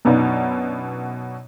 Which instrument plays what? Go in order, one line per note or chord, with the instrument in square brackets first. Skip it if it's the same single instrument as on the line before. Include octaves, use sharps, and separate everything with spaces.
[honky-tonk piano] F#2 B2 F#3 B3 D4 D#4